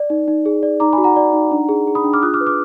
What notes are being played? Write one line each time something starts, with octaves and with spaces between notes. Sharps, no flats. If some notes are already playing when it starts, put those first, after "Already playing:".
Already playing: D5
D#4
D#4
G#4
D5
D#4 A#5 D6
G#5 B5
F#4
F#5 A#5
D5
D#4
D4
G#4
G#4
B5 D#6
D4
D6 F6
F4 D#6 F#6
D6 F6
B4
D6 F6